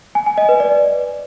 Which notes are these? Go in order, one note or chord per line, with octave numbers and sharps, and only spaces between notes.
G#5
G#5
D#5
B4
D5